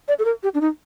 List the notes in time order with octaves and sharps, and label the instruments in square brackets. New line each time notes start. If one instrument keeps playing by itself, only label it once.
[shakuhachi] D5
A4
A#4
G4
D4
D#4